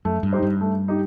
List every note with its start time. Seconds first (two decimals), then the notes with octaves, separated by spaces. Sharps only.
0.05 F#2 A3
0.23 G2
0.33 D#4 G4 C5
0.42 G2
0.61 A3
0.88 D#4 G4